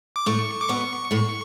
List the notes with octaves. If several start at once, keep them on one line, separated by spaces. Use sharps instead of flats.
D6
A2 A3 C#6
D6
B2 B3 C#6
A2 A3